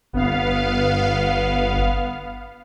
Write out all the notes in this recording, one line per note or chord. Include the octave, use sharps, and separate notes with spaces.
G1 B3 F5